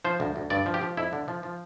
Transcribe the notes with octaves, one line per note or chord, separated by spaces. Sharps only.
F3 C5
D2
D2
G2 D5
F3
G4
F3
F2 E4
D3
F3
F3